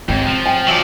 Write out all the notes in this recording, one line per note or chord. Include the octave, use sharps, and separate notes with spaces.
G#2 C4 G4 C#5
F3
G5 G#5
F3 F#3 D5 E5